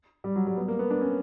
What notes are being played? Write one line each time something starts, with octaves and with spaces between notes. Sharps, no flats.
G3
F#3
G3
B3
A#3
B3
D4
C#4